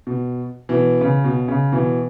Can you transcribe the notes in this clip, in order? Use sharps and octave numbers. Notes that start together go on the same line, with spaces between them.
B2
B2 E3
C#3
B2
C#3
B2 E3